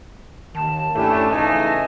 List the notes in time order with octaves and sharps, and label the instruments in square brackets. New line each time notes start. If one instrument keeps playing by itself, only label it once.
[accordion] D#2 [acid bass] D#3 [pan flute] A5
[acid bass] G2 [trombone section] A3 D4 [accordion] C#4 E4 G4
[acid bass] D1 [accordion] C#3 G#5 [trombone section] E3 A3 D#4